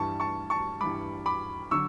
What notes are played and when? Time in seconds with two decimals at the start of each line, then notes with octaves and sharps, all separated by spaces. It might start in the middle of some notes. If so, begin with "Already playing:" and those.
Already playing: G2 E3 G3 A5 C#6
0.20 A5 C#6
0.50 A5 C#6
0.81 G2 E3 G3 B5 D6
1.26 B5 D6
1.71 D3 F#3 C#6 E6